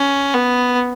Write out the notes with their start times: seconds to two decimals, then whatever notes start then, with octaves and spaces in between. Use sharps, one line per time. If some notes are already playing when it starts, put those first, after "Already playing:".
Already playing: C#4
0.34 B3